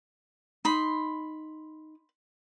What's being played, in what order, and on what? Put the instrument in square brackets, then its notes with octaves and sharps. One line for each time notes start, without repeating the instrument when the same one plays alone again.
[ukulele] D#4 [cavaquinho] B5 C6